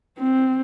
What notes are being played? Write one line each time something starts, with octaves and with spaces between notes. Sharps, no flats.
C4